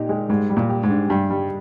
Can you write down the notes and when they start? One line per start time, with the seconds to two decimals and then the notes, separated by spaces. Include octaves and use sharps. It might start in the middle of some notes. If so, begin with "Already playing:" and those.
Already playing: A#2 D#4 G4
0.09 G#3
0.29 G#2 G3
0.50 G3
0.57 A#2
0.69 G4
0.83 G#2
0.90 D4
1.09 G2 G3
1.30 G3